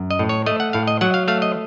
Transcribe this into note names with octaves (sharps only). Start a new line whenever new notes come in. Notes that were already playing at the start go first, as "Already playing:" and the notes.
Already playing: F#2
D#5
A2
C#5
A3 D#5
F#5
A2 F5
D#5
F#3 F#5
F5
A3 F5
D#5